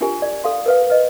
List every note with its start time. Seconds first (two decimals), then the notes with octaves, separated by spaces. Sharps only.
0.01 D4 F4 G4 A#4 G#5
0.22 D5
0.44 A4 F5 C6
0.66 A#4 B4 F5
0.90 B4 D#5